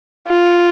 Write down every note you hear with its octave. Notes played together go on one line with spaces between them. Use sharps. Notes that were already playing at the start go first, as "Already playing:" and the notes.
F4